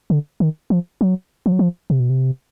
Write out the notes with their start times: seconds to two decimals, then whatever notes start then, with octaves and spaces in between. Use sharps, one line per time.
0.10 D3
0.40 D#3
0.70 F3
1.01 F#3
1.46 F3
1.52 F#3
1.59 F3
1.90 C3
2.00 B2
2.10 C3